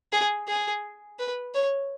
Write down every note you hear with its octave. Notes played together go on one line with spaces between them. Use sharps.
G#4
G#4
B4
C#5